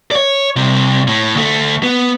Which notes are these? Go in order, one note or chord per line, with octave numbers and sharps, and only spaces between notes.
C#5 D5
C2 C3
A2
D2 A3
B3